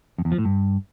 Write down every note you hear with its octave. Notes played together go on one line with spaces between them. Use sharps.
F2
E2
F3
A2
G2